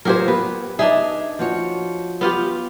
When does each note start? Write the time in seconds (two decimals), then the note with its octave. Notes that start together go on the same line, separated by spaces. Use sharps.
0.05 F#3 F4 G4 G#4 A#4 C5
0.28 B3 B4
0.79 D4 D#4 G#4 E5
1.39 F3 F#4 C#5
2.21 B3 F4 G4